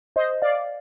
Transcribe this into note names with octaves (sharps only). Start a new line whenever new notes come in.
C5 D#5
D5 F5